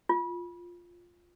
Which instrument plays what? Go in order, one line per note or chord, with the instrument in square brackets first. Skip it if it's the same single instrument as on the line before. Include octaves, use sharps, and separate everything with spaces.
[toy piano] F4